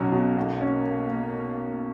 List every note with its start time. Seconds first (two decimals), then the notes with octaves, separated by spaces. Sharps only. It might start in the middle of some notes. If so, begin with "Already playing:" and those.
Already playing: B1 B2 F#3 C#4
0.12 B2
0.36 B1 A#3
0.61 C#4